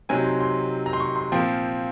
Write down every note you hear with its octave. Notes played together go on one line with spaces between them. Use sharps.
C3 F#3 C4 D#4 G#5
C6
C6
A#5
C6
C#6
C6
A#2 F3 C4